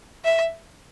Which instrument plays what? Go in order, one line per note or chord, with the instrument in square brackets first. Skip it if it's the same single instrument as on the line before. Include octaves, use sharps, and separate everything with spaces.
[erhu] E5